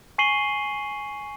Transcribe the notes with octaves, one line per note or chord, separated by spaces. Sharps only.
G#5 C#6 C7 D#7 F#7 G7